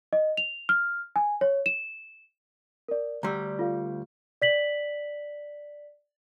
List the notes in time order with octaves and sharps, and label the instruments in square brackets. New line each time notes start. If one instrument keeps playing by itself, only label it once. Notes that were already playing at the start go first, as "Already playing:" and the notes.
[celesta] D#5
F7
F6
G#5
C#5
E7
A#4 D5
[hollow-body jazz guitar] D2 G3 [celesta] A#5 C6 E6
[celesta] F4 A4 F5
D5 B6 F#7